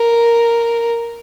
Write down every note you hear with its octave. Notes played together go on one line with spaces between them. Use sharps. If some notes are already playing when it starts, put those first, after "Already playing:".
Already playing: A#4